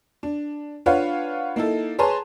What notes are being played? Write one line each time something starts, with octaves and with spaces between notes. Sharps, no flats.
D4
D4 F4 B4 C#5 F5 F#5
A#3 D#4 E4 A4
G#4 B4 C#5 A5 A#5 C6